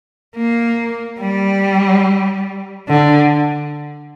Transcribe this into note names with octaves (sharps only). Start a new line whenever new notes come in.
A#3
G3
D3